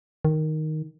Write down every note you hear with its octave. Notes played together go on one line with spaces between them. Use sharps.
D#3